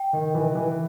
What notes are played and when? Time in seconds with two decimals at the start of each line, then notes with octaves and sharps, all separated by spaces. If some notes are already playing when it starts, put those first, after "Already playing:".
Already playing: G5
0.13 D#3
0.34 E3
0.55 E3